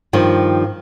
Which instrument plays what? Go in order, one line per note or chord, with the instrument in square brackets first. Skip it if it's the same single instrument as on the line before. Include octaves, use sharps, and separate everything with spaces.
[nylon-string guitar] G2 D#3 F3